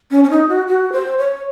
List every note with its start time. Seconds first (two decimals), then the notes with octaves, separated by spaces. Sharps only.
0.11 C#4
0.24 C#4
0.30 D#4
0.49 F#4
0.67 F#4
0.92 C5
1.18 C#5